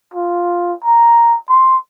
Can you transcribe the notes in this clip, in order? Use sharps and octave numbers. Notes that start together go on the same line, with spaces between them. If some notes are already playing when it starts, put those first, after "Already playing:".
F4
A#5
C6